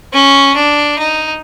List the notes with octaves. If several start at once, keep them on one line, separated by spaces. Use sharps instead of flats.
C#4
D4
D#4